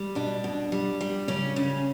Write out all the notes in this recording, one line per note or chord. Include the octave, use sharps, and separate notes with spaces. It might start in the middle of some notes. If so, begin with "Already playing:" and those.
Already playing: G3
B2 D4
B2
G3
G3
C#3 C#4
C#3